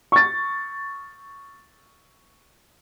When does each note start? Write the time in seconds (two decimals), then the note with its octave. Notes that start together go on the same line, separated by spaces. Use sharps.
0.12 C#6 A6